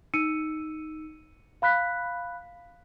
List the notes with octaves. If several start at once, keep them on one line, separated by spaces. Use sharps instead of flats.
D#4 E6 C#7 D#7
F5 B5 F#6 B6